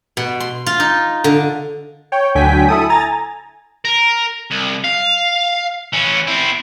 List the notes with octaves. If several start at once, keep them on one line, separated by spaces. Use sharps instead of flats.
B2
C6
F4
D#4
D3
C#5 G5
D2 D3 F#3 G5 G#5 B6
E4 A4 D#6
G#5 A#5 A6
A#4
C2
F5
E3 C#4
C4 E4